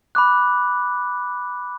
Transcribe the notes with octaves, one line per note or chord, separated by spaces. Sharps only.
B5 D6 F#6